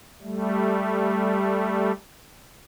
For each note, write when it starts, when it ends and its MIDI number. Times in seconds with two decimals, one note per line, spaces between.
0.22 1.92 55
0.22 1.92 57